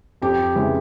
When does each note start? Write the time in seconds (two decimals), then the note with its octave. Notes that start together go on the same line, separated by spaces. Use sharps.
0.22 F2 G4
0.56 C#3 E3 G#3